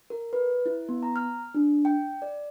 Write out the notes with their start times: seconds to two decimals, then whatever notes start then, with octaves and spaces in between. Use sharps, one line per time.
0.10 A#4
0.33 B4
0.66 E4
0.89 B3
1.03 A#5
1.16 F6
1.55 D4
1.85 G5
2.22 D5